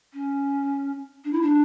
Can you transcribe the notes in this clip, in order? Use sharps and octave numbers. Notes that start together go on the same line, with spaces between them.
C#4
D4
E4
D4